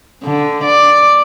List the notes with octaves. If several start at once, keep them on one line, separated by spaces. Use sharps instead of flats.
D3
D5